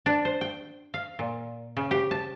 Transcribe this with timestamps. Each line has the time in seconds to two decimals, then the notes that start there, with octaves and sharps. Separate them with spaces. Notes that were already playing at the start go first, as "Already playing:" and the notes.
0.06 D4
0.25 C5
0.41 G5
0.94 F5
1.19 A#2
1.77 C#3
1.91 G4
2.11 A5